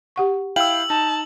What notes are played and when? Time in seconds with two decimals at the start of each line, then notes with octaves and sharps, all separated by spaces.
0.16 G4 F#5 C#6
0.56 E4 F5 G5 E6 F#7
0.90 D#4 A5